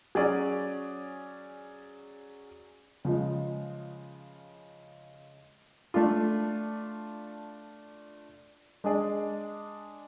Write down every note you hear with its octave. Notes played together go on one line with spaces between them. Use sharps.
F#3 C#4 G#4 D5
C#3 F3 G#3
A3 D4 F4
G#3 D4 G#4 D5